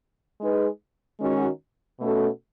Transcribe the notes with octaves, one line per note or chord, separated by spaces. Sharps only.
G#3 D#4 G#4 B4
D#3 G#3 C#4 F#4
B2 A3 C#4 F#4 A4